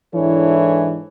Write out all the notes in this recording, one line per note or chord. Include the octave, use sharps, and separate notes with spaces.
G#2 E3 D4 E4 A4 C#5